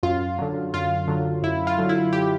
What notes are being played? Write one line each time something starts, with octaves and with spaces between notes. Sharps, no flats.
F#2 F4
D3 F#3
F#2 F4
D3 F#3
F#2 E4
F4
D3 F#3
E4
G4